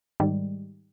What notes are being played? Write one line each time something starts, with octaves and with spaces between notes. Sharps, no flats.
G#2 D#3 G3